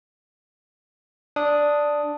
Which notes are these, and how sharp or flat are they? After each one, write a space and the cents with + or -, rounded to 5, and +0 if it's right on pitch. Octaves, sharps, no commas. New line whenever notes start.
D4 +0 D#6 +0